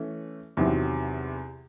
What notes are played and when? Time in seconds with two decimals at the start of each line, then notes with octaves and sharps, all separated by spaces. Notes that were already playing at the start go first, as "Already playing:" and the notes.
Already playing: E3 A3 C#4
0.57 E2 C3 D#3 F#3